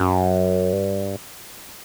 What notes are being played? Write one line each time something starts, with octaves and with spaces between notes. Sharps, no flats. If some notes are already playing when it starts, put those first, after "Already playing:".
Already playing: F#2
G2